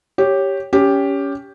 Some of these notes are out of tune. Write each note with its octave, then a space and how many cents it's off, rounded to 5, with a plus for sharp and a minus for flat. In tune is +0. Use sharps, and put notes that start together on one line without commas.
G4 +0 C#5 +0
C#4 +20 G4 +5